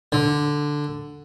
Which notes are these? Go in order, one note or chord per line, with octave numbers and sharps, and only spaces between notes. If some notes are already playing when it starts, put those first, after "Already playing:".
D3